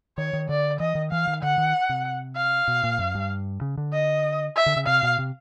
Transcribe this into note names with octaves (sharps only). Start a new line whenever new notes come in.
D#3 C#5
D#3
D3 D5
E3 D#5
D#3
E3 F5
D#3
D3 F#5
D#3
C3
F5
B2
A#2
F#2
G2
C#3
D3
D#5
E5
D3
C#3
C3 F5
B2
C3